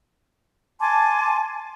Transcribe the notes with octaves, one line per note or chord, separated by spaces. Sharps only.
G#5 A5 C6 D6